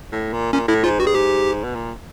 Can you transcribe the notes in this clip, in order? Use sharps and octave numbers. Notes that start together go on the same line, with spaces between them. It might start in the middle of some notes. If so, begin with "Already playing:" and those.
A2
A#2
A#2 C#4
A2 E4
G#2 F4
G2 F#4
G#4
G#2 G4
B2
A#2